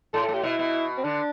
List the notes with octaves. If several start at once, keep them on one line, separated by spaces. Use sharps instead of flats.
A2 A4
A4
A2
G4
B2 E4
B2
C4
D3 D4